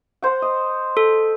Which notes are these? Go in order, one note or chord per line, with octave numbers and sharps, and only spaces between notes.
C5 F#5
D#5
A4